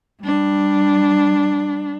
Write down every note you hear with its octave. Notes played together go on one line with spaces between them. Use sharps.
G3 D4